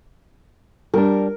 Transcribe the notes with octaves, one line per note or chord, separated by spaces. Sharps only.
G3 D4 A#4